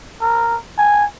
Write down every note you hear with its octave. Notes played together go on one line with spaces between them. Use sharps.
A#4
G#5